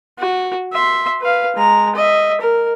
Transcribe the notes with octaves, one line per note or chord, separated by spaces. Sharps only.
F#4
E5 C6
B4 F5
G#3 A#5
D#5 E5
A#4